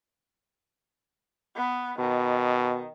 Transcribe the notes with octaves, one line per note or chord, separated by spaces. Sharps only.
B3
B2 D#3